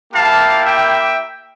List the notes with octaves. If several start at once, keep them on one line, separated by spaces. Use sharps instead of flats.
A#3 E4 G4 F5 A5
E5 G5